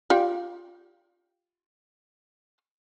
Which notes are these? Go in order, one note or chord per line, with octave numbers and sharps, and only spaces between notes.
F4 G4 D5